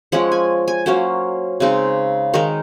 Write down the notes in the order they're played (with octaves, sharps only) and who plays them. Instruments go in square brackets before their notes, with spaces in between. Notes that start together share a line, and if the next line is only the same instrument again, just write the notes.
[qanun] F3 G#3 C#4 F#5
G#5
G#5
F#3 A#3 C#4 C5
C#3 G#3 C4 D#4
D#3 G#3 D#4 A#4